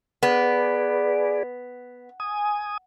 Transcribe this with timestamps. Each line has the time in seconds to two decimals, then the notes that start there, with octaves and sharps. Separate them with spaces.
0.23 B3 G#4 B4 D5
2.20 G#5 D#6